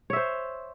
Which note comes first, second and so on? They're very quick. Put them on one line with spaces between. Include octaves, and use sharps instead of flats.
C#5 E5 C5